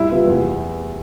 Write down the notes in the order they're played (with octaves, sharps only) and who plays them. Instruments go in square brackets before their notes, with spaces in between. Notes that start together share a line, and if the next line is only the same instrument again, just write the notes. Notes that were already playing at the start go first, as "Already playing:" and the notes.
Already playing: [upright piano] C2 [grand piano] E4
[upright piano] C3 F3 B3 F4
E2